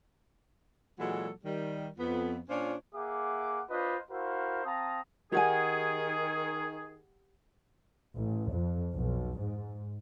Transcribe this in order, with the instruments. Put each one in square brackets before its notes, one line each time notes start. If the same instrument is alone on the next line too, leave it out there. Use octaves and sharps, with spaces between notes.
[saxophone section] A#2 E3 F#3 G#3 F#4 A4
D#3 G3
F2 B3
A#2 C#4 D4 F4 C5 C#5
[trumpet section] A#3 G#4 E5 F#5 D6
D4 F4 B4 C5 D#5
E4 F#4 A#4 C5 F5
C4 F5 A5 A#5 D#6
[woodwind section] D#3 G#4 [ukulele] G4 F#5 G#5
[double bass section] A1
F2
B1
G#2